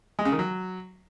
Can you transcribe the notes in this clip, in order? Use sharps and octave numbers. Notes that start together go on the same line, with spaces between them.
G#3
C#3
D#3
F#3